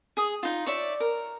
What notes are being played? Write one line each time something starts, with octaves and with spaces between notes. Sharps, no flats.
G#4 D#6
D#4 F4
C#5 D5 E5
A#4